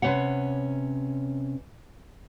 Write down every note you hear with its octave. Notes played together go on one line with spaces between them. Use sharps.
C3 C#4 B4 C#5 F#5